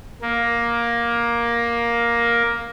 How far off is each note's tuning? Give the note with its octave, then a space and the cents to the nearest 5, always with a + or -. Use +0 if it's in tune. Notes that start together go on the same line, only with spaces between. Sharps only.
A#3 +10